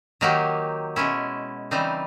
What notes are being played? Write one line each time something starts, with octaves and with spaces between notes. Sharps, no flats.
D#3 F#3 A#3 D#4 G4
B2 G#3 C#4 E4
C#3 E3 G3 C4 D#4